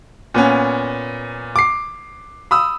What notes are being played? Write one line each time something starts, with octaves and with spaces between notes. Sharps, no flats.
A#2 B3 C#4
D6 C7
B5 D#6 E6